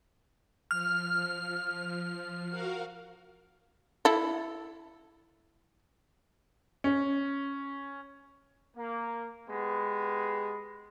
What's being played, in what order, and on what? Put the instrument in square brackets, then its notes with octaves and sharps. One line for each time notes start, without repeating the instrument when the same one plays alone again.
[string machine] F3 [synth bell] F6
[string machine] F#4 A#4 F5
[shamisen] E4 A4
[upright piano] C#4
[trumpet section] A#3
G#3 B3 G4 B5